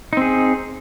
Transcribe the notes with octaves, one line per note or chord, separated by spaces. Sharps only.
C4 D#4 G#4